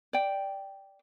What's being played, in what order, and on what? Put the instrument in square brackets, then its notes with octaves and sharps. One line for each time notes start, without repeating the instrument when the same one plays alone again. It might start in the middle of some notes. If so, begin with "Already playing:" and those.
[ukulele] D5 G5